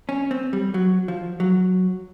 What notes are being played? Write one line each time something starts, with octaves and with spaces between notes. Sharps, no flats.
C#4
C4
G3
F#3
F3
F#3